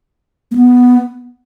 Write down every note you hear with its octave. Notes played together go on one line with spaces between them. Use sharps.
A#3
B3